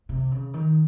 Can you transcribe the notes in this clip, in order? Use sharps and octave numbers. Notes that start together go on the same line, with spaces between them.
C3
C#3
D#3